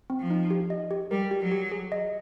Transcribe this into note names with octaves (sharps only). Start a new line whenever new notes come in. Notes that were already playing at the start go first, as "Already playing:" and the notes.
C4
F3
D#4
G4
D#5
G4
G3 A#4
G4
F#3
G4
G#4
D#5